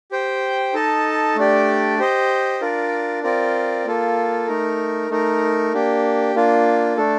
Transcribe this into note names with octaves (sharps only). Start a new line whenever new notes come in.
G4 C5 G5
D#4 A4 D#5 A5
A3 D4 G4 D5
G4 C5 D#5
D4 F4 A#4 D5
C4 F4 A#4 D5
A#3 F4 A4
A3 D#4 A#4
A3 D#4 A#4
A#3 D4 G4
A#3 D4 F4
A3 D4 A4